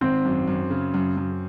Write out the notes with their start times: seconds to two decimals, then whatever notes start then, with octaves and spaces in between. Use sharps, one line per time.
0.01 G#1 C4
0.25 F#2
0.48 F#2
0.70 C#3
0.94 F#2
1.17 F#2